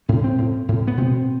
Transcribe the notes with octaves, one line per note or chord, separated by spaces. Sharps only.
A2 C#4
C4
A2
A2
B3
B2 C4